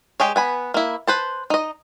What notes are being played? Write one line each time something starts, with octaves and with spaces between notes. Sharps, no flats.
G#3 G4 G#4 C#5
B3 G#5 B5
A#3 E4
B4 C5 A5
D#4 D#5